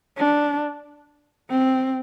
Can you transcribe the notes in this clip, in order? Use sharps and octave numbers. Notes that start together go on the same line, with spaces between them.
D4
C4